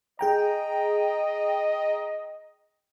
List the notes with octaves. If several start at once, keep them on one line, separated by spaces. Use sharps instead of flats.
G#4 D#5 G5 A#5